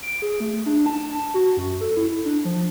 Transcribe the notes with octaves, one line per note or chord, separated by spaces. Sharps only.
D7
G#4
A3
D4
A5
A5
F#4
F#2
A4
E4
D4
F3